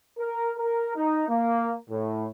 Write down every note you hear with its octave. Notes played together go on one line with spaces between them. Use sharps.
A#4
A#4
D#4
A#3
A2